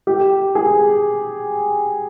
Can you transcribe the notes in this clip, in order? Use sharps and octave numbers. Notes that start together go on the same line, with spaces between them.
G4
G#4